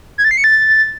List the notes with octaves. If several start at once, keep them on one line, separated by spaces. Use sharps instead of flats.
G#6
A6
C7
C#7
A6